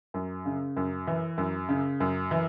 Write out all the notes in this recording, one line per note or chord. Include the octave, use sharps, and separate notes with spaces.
F#2
C#3
F#2
E3
F#2
C#3
F#2
E3